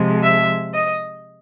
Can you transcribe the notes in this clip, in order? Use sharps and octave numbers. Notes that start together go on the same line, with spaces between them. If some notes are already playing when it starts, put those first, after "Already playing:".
Already playing: C3 F3 G#3
E5
D#5